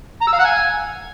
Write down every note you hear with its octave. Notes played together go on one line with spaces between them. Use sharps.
A#5
E6
F5
F#5
G#5